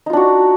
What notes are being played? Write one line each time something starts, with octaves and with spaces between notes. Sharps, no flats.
D4 D#4 F4 F#4